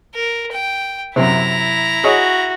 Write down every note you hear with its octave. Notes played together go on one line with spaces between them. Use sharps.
A#4
G5
F#2 C3 E4 A#5
F#4 G#4 C#5 D#5